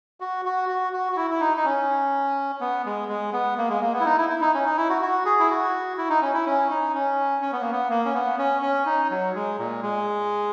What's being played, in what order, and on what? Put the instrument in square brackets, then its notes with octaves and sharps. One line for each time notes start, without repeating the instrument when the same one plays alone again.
[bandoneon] F#4
F#4
F#4
F#4
F#4
E4
E4
D#4
D#4
C#4
B3
G#3
G#3
B3
A#3
G#3
A#3
B3
E4
D#4
E4
E4
D#4
C#4
D#4
E4
F#4
F#4
G#4
E4
F#4
E4
D#4
C#4
E4
C#4
D#4
C#4
C#4
B3
A#3
B3
A#3
C#4
B3
C#4
C#4
D#4
F#3
G#3
A#2
G#3